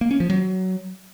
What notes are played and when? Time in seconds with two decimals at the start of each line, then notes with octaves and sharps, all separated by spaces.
0.01 A#3
0.11 C#4
0.20 F3
0.30 F#3